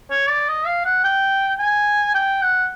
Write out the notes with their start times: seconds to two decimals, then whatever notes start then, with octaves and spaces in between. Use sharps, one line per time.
0.10 C#5
0.30 D5
0.48 D#5
0.66 F5
0.85 F#5
1.04 G5
1.59 G#5
2.14 G5
2.42 F#5